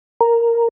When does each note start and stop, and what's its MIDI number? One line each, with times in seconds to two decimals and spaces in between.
0.21 0.68 70